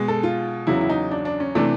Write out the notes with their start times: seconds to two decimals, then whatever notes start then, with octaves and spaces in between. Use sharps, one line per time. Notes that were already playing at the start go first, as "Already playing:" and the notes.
Already playing: B2 G#3
0.08 A4
0.23 F4
0.67 E2 C#3 F#3 E4
0.81 E4
0.89 D#4
1.11 D4
1.25 D4
1.40 C#4
1.55 C3 E3 A3 D4